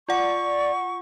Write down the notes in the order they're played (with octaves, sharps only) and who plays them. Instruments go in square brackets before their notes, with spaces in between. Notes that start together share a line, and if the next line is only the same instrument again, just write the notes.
[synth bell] F4 F#5 [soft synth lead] D5 [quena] C#6